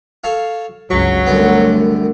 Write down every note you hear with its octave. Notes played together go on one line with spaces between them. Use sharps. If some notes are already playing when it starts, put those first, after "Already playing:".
A4 C#5 F5
G1 C#2 F#3 C#6
C2 F#2 D3 A3 B3